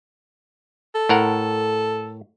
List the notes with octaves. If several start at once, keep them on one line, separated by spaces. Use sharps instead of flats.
A4
A2 A#4 F#5